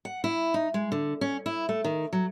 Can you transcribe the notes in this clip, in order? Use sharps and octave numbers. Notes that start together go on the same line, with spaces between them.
F#5
E4
D#4
G#3
D3
C#4
E4
A3
D#3
F#3